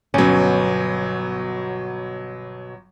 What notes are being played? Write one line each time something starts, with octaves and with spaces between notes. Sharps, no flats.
G1 B2 F#3 C#4